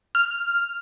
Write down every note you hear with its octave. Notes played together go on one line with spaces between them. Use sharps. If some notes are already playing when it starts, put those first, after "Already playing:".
F6